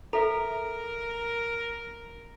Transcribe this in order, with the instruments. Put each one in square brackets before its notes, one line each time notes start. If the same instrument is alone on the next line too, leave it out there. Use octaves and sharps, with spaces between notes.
[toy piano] A4 [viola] A#4 [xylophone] E5 A#5